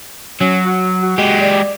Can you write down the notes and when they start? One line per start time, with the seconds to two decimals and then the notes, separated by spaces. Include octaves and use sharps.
0.41 F#3 C#4
0.65 F#4
1.03 F#4
1.18 G#3 G4
1.40 D5